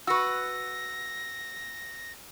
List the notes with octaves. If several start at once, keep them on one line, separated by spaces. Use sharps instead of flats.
F#4 B4 E6 A#6